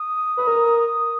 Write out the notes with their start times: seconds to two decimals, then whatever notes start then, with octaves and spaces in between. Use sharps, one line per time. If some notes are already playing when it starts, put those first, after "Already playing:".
Already playing: D#6
0.37 B4
0.47 A#4